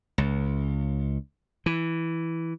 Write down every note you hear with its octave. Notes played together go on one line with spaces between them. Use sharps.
C#2
E3